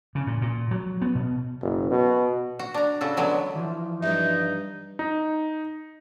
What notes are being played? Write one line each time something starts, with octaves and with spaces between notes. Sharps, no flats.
C#3
A#2
A#2
F#3
B3
B2
F#1
B2
F#4
D4 A#5
C#3 F#4 A4
D3 F#3 G#3 B3
E3 F3
G2 G3 D#4 E5
D#4